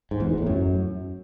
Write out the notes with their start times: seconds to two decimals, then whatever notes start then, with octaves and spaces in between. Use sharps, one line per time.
0.11 G#2
0.20 E2
0.29 A#2
0.38 A2
0.47 F#2